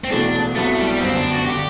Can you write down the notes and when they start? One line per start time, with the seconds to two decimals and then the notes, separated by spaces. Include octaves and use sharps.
0.04 C4
0.10 E1 E2 B2 A3 D4
0.56 C2 C3 F#3 A3 B3 E4
0.78 G3
1.00 G1 F#2 F#3 B3 C4
1.16 D4
1.31 F#4
1.46 D3 G4